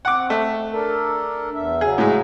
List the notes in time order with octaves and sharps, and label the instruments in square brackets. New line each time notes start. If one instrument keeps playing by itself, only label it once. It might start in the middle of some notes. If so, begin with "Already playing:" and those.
[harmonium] C4 [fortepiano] F#5 D6
[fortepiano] A3
[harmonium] D4 A4 A#4
E2 E5
[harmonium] C#3 F#3 [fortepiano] G#4
[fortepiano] A2 G#3